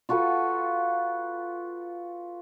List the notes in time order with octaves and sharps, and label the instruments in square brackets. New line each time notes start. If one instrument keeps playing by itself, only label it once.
[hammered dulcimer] F4 F#4 A4 B4